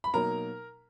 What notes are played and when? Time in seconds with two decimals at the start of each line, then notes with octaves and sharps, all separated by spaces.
0.04 B5
0.14 B2 F#3 A#3 D#4 A#4 A#5